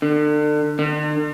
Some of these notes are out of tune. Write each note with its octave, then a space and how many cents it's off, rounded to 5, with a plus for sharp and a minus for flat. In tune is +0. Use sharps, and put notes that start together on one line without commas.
D3 +35
D3 +45